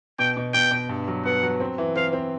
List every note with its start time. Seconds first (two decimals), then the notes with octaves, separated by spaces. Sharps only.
0.19 B2 G5
0.37 B2
0.54 B2 G5
0.71 B2
0.89 G2
1.08 F#3
1.25 B3 F#5
1.43 F#3
1.60 C4
1.78 E3
1.96 C4 F5
2.13 C4